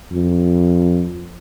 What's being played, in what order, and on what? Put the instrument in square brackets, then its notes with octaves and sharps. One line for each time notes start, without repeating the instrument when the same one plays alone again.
[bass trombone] F2